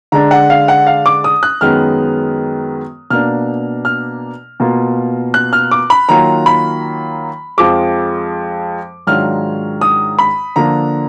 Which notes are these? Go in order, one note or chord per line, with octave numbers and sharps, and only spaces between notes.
D3 G#3 D4 A#5
F#5
F5
F#5
F5
D6
D#6
F#6
F#2 D#3 G#3 B3 F6
B2 A#3 D4 F6
F6
B2 A#3 F4
F#6
F6
D6
B5
D#3 F#3 A#3 F4 A#5
B5
F2 F3 G#3 D6
G#2 D#3 F#3 D4 F4 F6
D#6
B5
D3 F3 A#3 D4 A#5